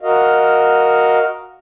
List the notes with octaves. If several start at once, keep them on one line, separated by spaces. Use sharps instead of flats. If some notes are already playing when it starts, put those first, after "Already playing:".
F#4 A#4 D#5 F5